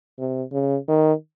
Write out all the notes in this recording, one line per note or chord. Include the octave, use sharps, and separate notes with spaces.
C3
C#3
D#3